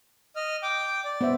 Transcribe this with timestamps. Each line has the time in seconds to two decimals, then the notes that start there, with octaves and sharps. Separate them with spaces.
0.36 D#5 F6
0.63 G5 D6
1.04 D5
1.21 B3 C5 E5